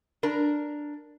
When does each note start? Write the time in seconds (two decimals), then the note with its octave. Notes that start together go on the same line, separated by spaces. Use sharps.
0.23 D4 A#4